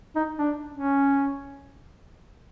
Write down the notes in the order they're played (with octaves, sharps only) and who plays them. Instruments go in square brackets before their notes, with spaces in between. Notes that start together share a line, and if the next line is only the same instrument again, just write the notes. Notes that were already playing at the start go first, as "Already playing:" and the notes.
[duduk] D#4
D4
C#4